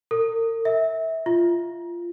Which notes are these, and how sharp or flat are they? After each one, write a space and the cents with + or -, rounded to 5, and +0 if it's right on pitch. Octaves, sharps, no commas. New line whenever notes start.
A#4 -40
E5 -25
F4 -20